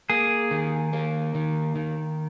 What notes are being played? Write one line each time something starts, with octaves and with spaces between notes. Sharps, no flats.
A#3 G#4
D#3
A#3
D#3
D#3